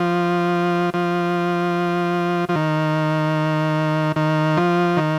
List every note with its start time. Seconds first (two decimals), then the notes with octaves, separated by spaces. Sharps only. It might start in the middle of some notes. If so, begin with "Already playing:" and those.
Already playing: F3
0.94 F3
2.49 F3
2.56 D#3
4.16 D#3
4.57 F3
4.97 D#3